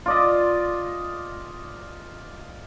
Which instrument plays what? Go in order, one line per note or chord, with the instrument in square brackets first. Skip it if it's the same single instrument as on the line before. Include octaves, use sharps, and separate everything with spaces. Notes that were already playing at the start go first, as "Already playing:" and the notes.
[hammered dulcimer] F4 D5 D#5